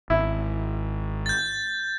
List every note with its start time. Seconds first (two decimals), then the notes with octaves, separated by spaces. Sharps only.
0.10 G#1 E4
1.26 G6 A6